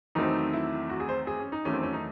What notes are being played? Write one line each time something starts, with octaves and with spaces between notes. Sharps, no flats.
E2 D#3 F#3 A3 C4 D#4
E4
F#4
G#4
C5
G#4
C#4
D#4
E2 D#3 F#3 A3 C#4
C4
C#4
D#4